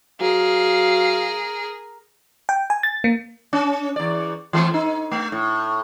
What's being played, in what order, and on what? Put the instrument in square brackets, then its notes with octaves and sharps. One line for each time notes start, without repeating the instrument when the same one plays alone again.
[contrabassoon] F#3 [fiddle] G#4 [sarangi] A#4 [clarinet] F5
[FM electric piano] G5
G#5
A6
A#3
[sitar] C#4
E2 D5
E3 A3 C4
D#4
A3
A2